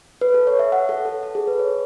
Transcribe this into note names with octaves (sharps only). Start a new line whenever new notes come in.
B4
A4
C#5
E5
F#5
A4
A4
A4
G#4
B4
C#5